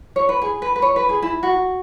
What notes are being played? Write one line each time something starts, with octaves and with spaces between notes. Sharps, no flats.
C#5
B4
G#4
B4
B4
C#5
B4
G#4
E4
F#4